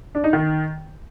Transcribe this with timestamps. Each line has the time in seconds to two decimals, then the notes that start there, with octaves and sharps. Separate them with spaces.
0.15 D4
0.24 D#4
0.33 D#3